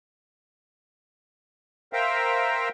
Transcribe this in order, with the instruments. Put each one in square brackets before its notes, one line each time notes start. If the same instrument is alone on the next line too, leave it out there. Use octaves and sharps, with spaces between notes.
[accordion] A#4 C5 E5 F5 G5 A#5